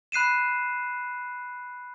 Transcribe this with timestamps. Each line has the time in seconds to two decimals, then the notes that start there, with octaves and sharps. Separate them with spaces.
0.12 B5 F#6 C7 D#7 E7